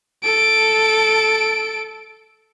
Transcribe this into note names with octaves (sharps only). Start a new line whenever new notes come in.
A4 D7